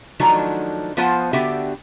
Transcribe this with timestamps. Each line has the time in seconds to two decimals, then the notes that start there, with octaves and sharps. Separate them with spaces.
0.20 D#3 F3 F#3 A3 D4 D#4
0.97 F3 B3 F4 C5 F#5 A5
1.33 D3 B3 F#4 G4 E5 G5